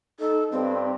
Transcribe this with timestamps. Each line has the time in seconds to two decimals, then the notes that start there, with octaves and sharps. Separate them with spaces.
0.20 D#4 A4
0.52 G2 C4